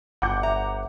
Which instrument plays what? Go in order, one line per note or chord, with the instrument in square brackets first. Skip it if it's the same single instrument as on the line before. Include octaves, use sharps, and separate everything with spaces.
[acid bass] G1 [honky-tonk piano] F#5 D6 G6
[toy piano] E5 [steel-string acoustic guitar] A#5